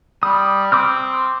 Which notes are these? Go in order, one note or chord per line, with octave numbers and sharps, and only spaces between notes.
G3 D#6
C4 D6 D#6 F6